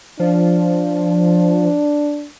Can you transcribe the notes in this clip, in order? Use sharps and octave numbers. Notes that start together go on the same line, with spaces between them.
F3 D4